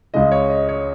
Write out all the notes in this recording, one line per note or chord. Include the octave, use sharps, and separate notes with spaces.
C#2 C#3 G#3 D#5
C#5
D#5
C#5